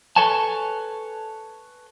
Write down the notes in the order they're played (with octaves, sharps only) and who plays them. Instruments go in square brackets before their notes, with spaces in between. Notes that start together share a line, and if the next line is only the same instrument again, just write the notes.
[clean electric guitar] A4 B4 C#5 G#5 A5